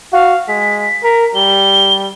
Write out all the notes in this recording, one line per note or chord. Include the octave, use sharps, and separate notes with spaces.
F#4 F5
G#3 B6
A#4
G3 G7